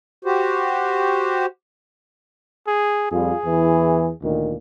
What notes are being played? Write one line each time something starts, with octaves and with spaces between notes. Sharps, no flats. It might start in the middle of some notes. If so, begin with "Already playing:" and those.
F#4 G4 C5
G#4
F2 G3 F4 G#4
E2 E3
D2 A#2 D#3